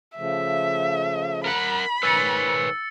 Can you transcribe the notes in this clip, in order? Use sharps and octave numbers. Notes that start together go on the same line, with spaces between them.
C#3 F3 A3 E5
A#4 F#5 B5
G#2 D#3 B4 C#5 G#5 E6 A6 C#7